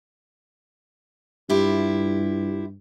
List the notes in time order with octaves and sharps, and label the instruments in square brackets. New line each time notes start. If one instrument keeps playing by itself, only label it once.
[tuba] G2 [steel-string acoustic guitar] E4 F4 G4